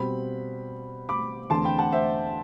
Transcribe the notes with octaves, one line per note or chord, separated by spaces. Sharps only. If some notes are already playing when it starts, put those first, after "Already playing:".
Already playing: B2 G3 C4 B5
B5 D6
E2 D3 A3 C4 A5 C6
G5 B5
F#5 A5
C5 E5